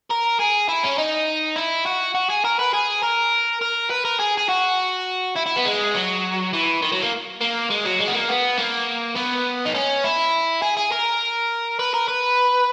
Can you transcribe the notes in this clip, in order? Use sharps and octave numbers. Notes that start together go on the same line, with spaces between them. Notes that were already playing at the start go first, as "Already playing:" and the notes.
A#4
G#4
E4
C#4
D#4
E4
F#4
F#4
G#4
A#4
B4
G#4
A#4
A#4
B4
A#4
G#4
G#4
F#4
E4
E4
B3
G#3
F#3
E3
D#3
F#3
A#3
A#3
G#3
F#3
G#3
B3
A#3
B3
A#3
B3
D#4
C#4
E4
G#4
G#4
A#4
B4
A#4
B4